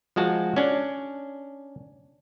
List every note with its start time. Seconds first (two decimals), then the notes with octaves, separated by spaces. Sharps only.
0.16 F3 G#3 F#4 A5
0.56 C#4 D4